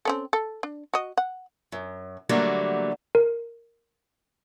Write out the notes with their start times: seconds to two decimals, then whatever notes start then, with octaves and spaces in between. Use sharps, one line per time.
0.05 C4 C#4 A4
0.33 A4
0.63 D4
0.94 F#4 D#5
1.17 F#5
1.72 F#2
2.29 D3 F#3 G3 A3 A#3
3.15 A#4